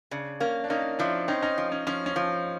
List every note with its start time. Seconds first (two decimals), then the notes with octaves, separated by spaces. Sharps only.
0.11 C#3 D4
0.40 A#3 C#4
0.64 D4
0.70 A#3 C#4 D#4
0.99 F3 D4 E4
1.28 C4 C#4 D#4
1.42 C#4 D#4
1.58 F3
1.72 C#4
1.87 F3 C#4
2.06 C#4
2.16 F3